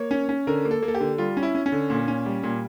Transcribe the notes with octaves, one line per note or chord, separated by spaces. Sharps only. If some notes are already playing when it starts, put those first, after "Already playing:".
Already playing: A#3 C#5
C#4
C#4
D3 A#4
A#3
A4
A#3
A4
G4
D3
G3 F4
C#4
E4
C#4
C#4
D3
A#2
C#4
G3
A#2